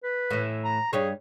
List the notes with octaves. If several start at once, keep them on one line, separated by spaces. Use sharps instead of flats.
B4
A2 E3
A#5
G2 G3 G#4 C#5